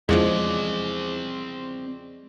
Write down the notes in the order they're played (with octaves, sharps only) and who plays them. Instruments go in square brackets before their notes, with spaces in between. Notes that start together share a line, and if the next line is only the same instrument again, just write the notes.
[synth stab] E2 C#3 F3 [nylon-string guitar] G#3 [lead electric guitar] C4 D5